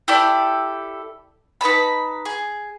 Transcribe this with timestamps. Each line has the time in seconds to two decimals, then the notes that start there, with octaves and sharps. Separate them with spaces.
0.08 E4 G4 A4 D5
1.61 D#4 B4 A5 B5
2.25 G#4